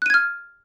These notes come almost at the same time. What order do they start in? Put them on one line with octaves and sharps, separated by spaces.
F#6 D#7 G#6 F6